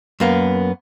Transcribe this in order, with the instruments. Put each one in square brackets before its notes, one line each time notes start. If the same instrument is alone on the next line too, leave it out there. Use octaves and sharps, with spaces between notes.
[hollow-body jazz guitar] F#2 A#3 B3